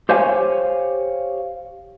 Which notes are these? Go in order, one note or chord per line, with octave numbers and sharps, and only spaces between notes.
G4 C5 C#5 F5 G#5